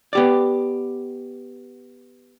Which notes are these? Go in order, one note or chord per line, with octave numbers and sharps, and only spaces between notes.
B3 G4 D5